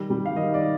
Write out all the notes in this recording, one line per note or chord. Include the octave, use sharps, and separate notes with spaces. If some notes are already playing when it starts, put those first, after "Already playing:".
Already playing: D#3 G3
G3
F5
D#3 D#5
D5